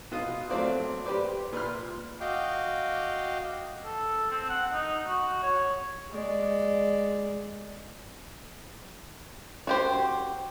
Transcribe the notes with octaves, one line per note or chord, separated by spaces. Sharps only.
B2 F4 D#6
F#3 A3 C4 C5 D5 F5
G4 B4 C5 D5
A#2 B4 C6 F6
F#4 D#5 F5 G5 D6
A4
C4
F#5
D#4
F#4
C#5
G#3 D5
F#4 G4 C5